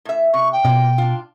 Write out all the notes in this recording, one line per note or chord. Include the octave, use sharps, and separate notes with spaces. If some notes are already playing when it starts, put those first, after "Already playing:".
A2 E5
C3 C#6
G5
B2 A#3 F4 D5
D4 F4